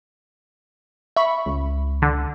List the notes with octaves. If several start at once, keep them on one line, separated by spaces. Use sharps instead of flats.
E5 B5 C#6
C#2
D3